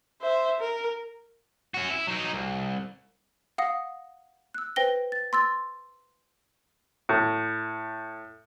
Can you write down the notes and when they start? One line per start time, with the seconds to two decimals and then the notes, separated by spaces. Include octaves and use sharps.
0.22 C5 E5
0.60 A#4
1.74 C#4 F#4
1.90 E4
2.07 F#3 D#4
2.33 C2
3.58 F5 F#5 D#6 A#6
4.54 E6 F#6
4.76 B4 C5 G5 A#6 G7
5.12 A6
5.33 C6 E6 A6
7.09 A2